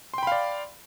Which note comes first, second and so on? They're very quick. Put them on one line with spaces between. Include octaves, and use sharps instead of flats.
C6 G5 B5 F5 D5